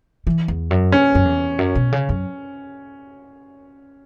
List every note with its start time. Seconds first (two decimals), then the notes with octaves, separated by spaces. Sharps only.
0.27 E3
0.48 E2
0.71 F#2
0.92 C#4
1.15 F#2
1.25 E2
1.59 F#2
1.75 B2
1.92 C#3
2.09 F#2